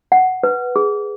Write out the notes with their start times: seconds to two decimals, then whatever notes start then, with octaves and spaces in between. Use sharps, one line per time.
0.12 F#5
0.43 B4
0.76 G#4